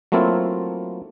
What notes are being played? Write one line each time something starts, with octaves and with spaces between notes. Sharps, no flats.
F#3 A3 A#3 C4 E4 F4